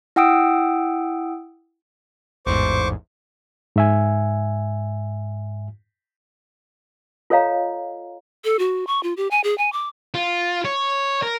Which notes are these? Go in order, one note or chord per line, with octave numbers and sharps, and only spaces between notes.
E4 F#5 G5 D#6 E6 D7
A1 E2 G#2 C5 C#6 D6
G#2 E5 G#5
F4 A4 C#5 D#5 F5 A#5
A4
F#4
C#6
F4
G4
G#5
G#4
G#5
D6
F4
C#5
A#4